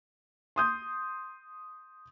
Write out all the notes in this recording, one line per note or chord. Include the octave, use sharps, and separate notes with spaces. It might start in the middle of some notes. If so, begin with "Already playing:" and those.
C6 D#6 G6